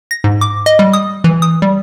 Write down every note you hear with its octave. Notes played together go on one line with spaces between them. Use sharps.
A#6
G#2
D6
D#5
G3
D#6
E3
D#6
G3